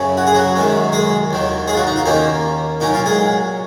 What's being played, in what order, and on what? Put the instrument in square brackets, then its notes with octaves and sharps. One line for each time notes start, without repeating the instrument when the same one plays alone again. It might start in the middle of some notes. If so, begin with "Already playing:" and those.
Already playing: [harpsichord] F#2 C#3 C#4
F#4
G#4
F#3 F#4
F#2 D#3 G#3 C#4
G#3 G#4
D#2 D#3 F#3
G#3 G#4
F4
F#3 F#4
D#4
F4
D#2 D#3 A#3 C#4 D#4
A#2 F#3 C#4 D#4
F4
G#3 G#4